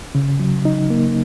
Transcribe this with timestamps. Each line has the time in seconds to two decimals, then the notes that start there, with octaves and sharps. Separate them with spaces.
0.15 C#3
0.40 F#3
0.65 D#4
0.90 A#3